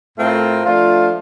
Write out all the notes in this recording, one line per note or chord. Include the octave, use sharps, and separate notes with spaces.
A2 A3 C4 F4 A#4
F3 A3 D4 F4